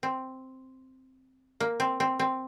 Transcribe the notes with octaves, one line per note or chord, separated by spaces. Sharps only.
C4
A#3
C4
C4
C4